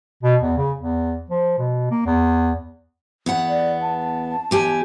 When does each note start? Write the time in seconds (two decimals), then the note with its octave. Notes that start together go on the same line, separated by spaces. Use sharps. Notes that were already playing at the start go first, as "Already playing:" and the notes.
0.23 B2
0.42 E2
0.57 C#3
0.78 E2
1.30 F3
1.59 B2
1.91 A#3
2.06 E2
3.26 E2 B3 F#5
3.48 D5
3.82 A5
4.51 E2 G4 G#5